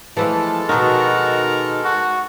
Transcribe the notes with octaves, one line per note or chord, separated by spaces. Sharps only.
E3 F3 G#3 A3 A4 A5
B2 D#3 D#4 F#4 A#4
F#4